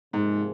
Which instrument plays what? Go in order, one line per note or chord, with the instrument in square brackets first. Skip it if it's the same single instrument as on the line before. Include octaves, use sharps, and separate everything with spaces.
[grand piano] G#2 [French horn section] C3 F3 A#3 D#4 G#4